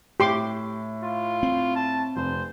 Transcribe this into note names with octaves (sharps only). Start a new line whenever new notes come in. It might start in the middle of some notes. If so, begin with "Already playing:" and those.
A2 G4 C6 D6
F4
C4
A5
F1 C5